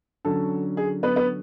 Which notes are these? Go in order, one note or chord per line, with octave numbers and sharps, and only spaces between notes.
D3 F#3 C#4 A4
G#4
B3 B4
B3 B4